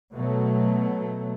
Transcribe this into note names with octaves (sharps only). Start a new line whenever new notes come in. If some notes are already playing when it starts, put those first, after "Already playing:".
B2 F#3 A3